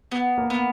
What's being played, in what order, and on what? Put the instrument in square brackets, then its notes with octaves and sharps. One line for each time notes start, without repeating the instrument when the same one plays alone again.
[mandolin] B3
[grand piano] A#3
[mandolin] B3